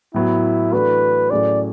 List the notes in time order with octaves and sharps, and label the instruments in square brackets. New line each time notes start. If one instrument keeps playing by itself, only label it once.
[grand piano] A2 F#3 B3 [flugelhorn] E4
[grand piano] E3 A3 D4 F#4 [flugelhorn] B4
[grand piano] A2 F#3 A3 C#4 G#4 [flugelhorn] D5